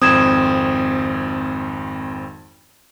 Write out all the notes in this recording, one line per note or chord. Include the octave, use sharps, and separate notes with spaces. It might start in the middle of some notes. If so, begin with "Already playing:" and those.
G#1 F2 C4 D#6 G#6 E7